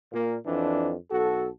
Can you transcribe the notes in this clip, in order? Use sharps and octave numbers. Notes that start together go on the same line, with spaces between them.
A#2 A#3
F2 E3 D4
B1 F#4 A4